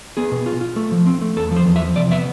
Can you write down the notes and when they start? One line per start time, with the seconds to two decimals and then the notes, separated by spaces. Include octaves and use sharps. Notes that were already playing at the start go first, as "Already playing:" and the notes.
0.17 B3 G#4
0.31 B2
0.46 F4
0.61 F4
0.76 A3
0.92 F3
1.06 C4
1.21 A3
1.36 E2 A4
1.51 F3
1.56 C5
1.66 E2
1.76 E5
1.82 F3
1.96 C3 D5
2.11 B3 E5